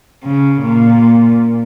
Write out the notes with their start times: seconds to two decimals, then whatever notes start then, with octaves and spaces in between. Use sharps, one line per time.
0.24 C#3
0.62 A#2